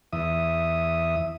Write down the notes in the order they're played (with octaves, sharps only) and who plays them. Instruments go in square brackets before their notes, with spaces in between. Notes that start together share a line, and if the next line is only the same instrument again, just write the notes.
[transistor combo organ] E2 E5 D#6